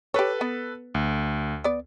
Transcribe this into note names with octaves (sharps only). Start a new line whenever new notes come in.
G4 A4 B4 C#5
B3
D2
B3 D5